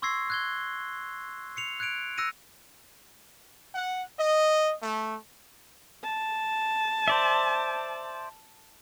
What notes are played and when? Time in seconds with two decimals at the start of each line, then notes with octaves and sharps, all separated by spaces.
0.02 C6 C#6 E6 G#6 A#6 C7
0.30 F#6 G#6 G7
1.56 C7 C#7 F7
1.80 F#6 G#6 C#7 D7 F7
2.18 E6 F#6 A#6 C#7 D#7
3.74 F#5
4.19 D#5
4.82 A3
6.03 A5
7.08 C5 D5 E5